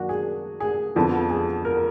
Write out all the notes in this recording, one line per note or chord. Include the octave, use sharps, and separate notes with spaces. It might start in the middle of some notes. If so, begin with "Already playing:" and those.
Already playing: F#2 D#3 A#3 D4 F#4
G#4
G#4
F2 D3 F3 B3
G#4
A#4